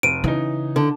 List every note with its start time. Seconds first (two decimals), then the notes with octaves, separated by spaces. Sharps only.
0.03 F1 D7 D#7
0.24 C#3 E3 D#4
0.76 D3